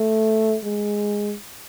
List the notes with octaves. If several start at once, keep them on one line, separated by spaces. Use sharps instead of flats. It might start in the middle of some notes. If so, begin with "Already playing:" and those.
Already playing: A3
G#3